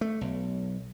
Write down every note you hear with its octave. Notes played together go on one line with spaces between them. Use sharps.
A3
B1